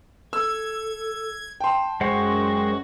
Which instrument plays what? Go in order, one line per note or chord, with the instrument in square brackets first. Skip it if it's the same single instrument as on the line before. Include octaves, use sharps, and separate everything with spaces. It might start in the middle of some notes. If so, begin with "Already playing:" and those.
[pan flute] A4 [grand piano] E6 [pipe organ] G#6
[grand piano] G5 C6 [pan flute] A5
[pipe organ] F#2 F#4 [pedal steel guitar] G#3 C5 F#5 [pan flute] C#6